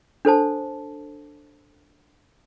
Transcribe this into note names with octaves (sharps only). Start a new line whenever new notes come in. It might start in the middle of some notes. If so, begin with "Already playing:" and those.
D4 A4 C5 A5